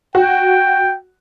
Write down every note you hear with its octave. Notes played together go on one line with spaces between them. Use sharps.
F#4 G5